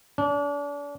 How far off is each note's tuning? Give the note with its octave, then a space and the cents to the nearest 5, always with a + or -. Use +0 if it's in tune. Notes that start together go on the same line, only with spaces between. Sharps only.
D4 -35